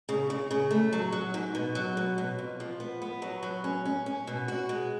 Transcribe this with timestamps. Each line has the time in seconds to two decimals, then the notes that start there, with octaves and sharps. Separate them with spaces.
0.09 C#3
0.30 C#3
0.51 C#3
0.71 A3
0.93 F#3
1.12 F#3
1.34 G#2
1.55 B2
1.75 F#3
1.97 B2
2.18 B2
2.39 F2
2.60 F3
2.80 B3
3.02 B3
3.22 F#3
3.43 F#3
3.64 C#4
3.85 C#4
4.06 C#4
4.27 B2
4.48 F#4
4.69 G#3